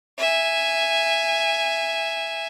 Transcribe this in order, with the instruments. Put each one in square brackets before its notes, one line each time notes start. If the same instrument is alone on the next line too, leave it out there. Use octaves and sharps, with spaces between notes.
[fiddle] E5 G#5